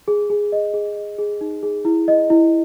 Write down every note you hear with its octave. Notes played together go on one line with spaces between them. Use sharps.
G#4
G#4
D#5
G#4
D#5
G#4
D#4
G#4
E4
D#5
E4